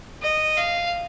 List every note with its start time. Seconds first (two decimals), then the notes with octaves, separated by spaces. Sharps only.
0.23 D#5
0.57 F5